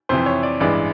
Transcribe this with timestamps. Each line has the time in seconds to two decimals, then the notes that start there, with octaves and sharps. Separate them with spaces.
0.09 F2 C3 E3 C5
0.26 C#5
0.43 D5
0.60 A1 G2 E3 G#3 D5